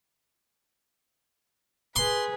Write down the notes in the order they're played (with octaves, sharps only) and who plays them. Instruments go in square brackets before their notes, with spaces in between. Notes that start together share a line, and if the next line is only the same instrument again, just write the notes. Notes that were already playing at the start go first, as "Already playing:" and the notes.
[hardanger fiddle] G#4 B4 [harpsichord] C6